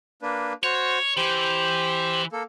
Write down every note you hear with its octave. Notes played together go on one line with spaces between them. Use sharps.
A#3 D4 B4
F#4 C5 C#5
E3 G4 C5
A#3 A4